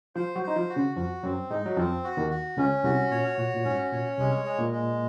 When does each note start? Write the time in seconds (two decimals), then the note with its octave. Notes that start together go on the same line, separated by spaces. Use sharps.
0.15 F3 F4 C5
0.36 F#3 F#4
0.43 D#4 C5
0.56 F3 F4
0.70 F#4
0.76 C#3 C#4
0.96 F2 F3 F#4
1.23 F#2 F#3 C4
1.50 G#2 G#3 D#4
1.66 F#3
1.77 F2 F3 C4
2.04 F#4
2.17 D#2 D#3
2.30 F#4
2.57 C#2 C#3 C#4
2.84 C2 C3 F#4
3.11 A#2 C#5
3.38 A#2 F#4
3.54 A#2
3.65 G#2 C#4
3.92 A#2 C#5
4.18 C2 C3 G#3
4.45 G#3
4.58 A#2 A#3
4.71 G#3